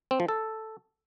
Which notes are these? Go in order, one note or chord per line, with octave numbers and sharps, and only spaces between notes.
C4
F3
A4